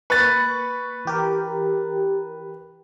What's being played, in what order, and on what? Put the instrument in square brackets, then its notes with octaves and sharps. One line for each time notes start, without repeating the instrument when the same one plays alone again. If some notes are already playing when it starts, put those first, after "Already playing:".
[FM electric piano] A#3 B5 C#6 [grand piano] B4 A6
[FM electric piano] E3 G4 A#4